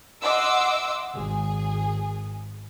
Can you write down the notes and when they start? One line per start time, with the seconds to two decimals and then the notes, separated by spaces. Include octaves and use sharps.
0.21 D#5 E5 F#5 C6 D6 E6
1.14 G#1 G#4